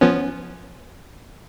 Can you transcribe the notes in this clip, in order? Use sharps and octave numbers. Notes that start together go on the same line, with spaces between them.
F3 B3 C#4